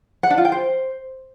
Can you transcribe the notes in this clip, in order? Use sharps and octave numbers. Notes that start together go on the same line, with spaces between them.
F#5
D4
F4
G5
C5